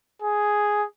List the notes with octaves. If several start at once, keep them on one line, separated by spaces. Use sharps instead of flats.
G#4